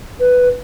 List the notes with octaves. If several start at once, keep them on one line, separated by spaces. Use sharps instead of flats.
B4